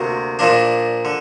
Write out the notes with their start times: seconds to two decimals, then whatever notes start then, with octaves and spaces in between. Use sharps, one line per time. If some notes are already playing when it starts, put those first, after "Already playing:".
Already playing: D2 C3 A#3
0.39 A#2 F3 A#3 D4
1.05 D3